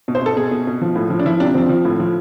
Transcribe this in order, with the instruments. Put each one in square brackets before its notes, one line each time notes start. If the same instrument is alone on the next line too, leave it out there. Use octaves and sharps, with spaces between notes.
[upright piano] B2
C5
B2 A4
B2 G#4
B2
B2
F3
A2
F3
D4
F3 E4
C3 D4
F3 C4
F3
A2
F3